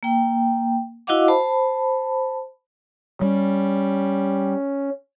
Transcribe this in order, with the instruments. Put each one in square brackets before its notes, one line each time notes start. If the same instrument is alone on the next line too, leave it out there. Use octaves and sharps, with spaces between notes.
[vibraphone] A#3 G5
E4 F#4 D#5 F5 F#5 D6
C5 A5 B5
[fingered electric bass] G3 [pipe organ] C#4